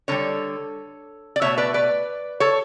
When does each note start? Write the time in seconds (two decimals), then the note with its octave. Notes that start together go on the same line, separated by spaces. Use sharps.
0.08 D3 G3 A4 C#5
1.36 D5
1.41 B2 A3 C#5 E5
1.58 B4 D5
1.74 B4 D5
2.40 A4 C#5